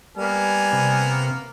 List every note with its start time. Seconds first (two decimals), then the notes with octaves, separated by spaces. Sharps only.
0.17 G3 A#3 B3 G#5 F6
0.73 C3